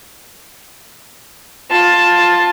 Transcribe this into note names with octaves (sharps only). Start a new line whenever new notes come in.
F4 A5